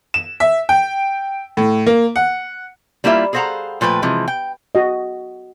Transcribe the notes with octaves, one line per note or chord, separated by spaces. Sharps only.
E7
E5
G5
A2
A#3
F#5
G3 A#3 E4 F4 C#5 E5
G#4 A4 C5 F5 F#5 A#5
A#2 F3 A3 B4 G5
C3 E3 F3 G#3
G5
F#4 D#5